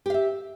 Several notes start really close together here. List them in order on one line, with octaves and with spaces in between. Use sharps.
G4 F5 E5